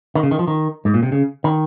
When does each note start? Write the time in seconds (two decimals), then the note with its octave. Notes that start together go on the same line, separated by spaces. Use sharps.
0.15 D#3
0.23 C#3
0.31 D#3
0.39 F3
0.48 D#3
0.85 G#2
0.94 A#2
1.03 C3
1.12 C#3
1.44 D#3